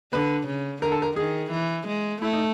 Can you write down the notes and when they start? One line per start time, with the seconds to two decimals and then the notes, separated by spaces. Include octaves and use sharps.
0.12 D3 B4
0.47 C#3
0.82 D3 A#4
0.92 A4
1.02 A#4
1.16 D#3 G#4
1.51 E3
1.87 G#3
2.22 A3 E4
2.33 D#4